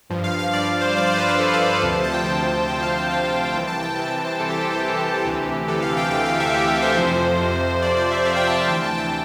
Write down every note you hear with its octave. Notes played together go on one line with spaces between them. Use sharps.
G2 F3
F5
F5
G2 F3 D5
D5
C5
G2 F3 D5
C5
B4
B4
G2 F3 A4
F5
D2 C3 F3 A4
C5
A5
G5
D2 C3 F3 A5
D2 C3 F3 G5
F5
F5
D2 C3 F3 F5
G5
C2 C3 E3 G5
A5
G5
C2 C3 E3 G5
G5
C5
C2 C3 E3 A4
G4
A4
G4
C2 C3 E3
D2 C3 E3
D2 C3 E3 A4
F5
G5
D2 C3 E3 G5
F5
E5
D2 C3 E3 G4
A4
C5
F2 C3 F3
F2 C3 F3
F2 C3 F3 D5
D5
E5
F2 C3 F3 F5
G5
A5
G5
D2 C3 E3 G5
A5
G5